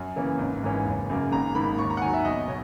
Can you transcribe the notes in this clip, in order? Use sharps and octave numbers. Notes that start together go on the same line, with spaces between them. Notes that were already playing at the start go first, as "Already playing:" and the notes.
Already playing: F#2 G#5
C#3 E3 A#3 C#4
G#1
G#2 E3 A#3 C#4
F#1
F#2 C#3 F#3 A#3
G#1 A#5
G#2 D#3 A#3 B5
D#2 C#6
A#5
F#5
D#3 F#3 G#5
E5
B1 D#5
B2 C#5